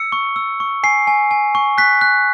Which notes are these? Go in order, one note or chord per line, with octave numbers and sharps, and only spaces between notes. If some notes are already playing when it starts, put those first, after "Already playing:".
Already playing: E6 C#7
C#6
E6
C#6
G#5 C7
G#5
G#5
C#6
F#6 B6
F#6